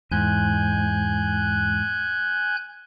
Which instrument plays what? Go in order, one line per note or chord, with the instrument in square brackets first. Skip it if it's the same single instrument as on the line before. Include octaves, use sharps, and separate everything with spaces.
[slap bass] E2 [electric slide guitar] G#2 [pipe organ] G#5 F#6 G6